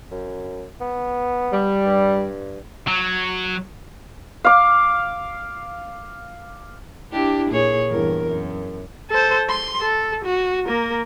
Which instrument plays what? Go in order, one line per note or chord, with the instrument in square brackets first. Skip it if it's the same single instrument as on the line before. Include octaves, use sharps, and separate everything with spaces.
[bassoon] F#2
B3
[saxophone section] G3
[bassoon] G2
[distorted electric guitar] F#3
[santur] F5 D6
[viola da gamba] D4 E4 G4
A#2 G#4 C#5
E2 G2 A#4
F#2
[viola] A4 C5
C6
A4
F#4
A#3 A#4